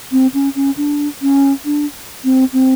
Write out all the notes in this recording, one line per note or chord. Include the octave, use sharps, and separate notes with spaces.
C4
C#4
C#4
D4
C#4
D4
C4
C4